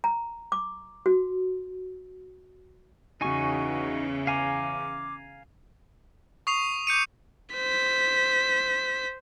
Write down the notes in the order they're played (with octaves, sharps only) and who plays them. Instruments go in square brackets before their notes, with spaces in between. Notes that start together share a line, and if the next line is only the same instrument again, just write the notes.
[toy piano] A#5
D6
F#4
[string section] E2 C#3 E3 [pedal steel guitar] D#4 G#5 C#6 [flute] F#4
[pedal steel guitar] F5 G#5 A#5 [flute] D6
[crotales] C#6 D#6 C7 F7
D6 G6 C#7 D#7
[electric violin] C5 B6